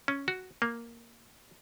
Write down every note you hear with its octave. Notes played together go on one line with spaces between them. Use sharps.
C#4
F#4
A#3